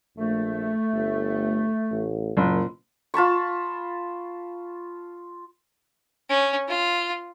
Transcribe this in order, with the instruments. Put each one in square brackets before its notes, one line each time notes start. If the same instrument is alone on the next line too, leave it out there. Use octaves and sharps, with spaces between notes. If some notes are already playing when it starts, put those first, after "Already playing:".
[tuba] A#1 [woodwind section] A3
[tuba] G1
A1
[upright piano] F#1 [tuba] A#2
[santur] F4 A5 B5 C#6
[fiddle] C#4
F4